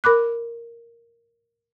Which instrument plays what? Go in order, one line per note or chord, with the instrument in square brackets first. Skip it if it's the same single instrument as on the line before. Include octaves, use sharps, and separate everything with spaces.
[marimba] A#4 B5 D6 F#6